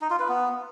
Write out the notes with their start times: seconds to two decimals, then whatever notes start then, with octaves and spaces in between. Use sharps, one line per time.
0.01 D#4
0.10 F4
0.19 B4
0.28 B3